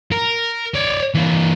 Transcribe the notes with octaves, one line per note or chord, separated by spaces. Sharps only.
A#4
C#5 D5
E3 A#3